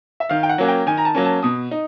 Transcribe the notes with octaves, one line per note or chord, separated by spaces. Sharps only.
E5
D#3 F5
G5
F#5
F#3 A#3 C#4
G5
D#3 G#5
A#5
A5
F#3 A#3 C#4
A5
B2 D#6
D#4